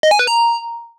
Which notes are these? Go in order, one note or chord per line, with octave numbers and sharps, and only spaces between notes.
D#5
G#5
B4
A#5